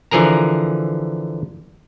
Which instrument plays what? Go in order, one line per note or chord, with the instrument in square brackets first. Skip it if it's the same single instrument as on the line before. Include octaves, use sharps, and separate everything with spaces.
[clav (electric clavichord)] D3 E3 F3 G#4 A#4 A#5